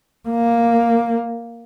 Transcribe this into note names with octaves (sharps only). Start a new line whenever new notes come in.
A#3